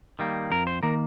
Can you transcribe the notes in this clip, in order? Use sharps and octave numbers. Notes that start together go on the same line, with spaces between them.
D#3 G3 A#3
F2 A#4
C5
D#3 A#3 A#4